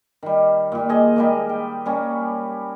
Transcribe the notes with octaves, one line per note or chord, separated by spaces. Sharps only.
D#3 G3
A#2 G3
G#4 C5 D#5
G3 G#3 A#3
G5
G3 A#3 C#4